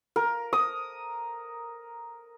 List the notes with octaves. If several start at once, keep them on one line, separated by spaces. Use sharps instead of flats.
A#4
D#6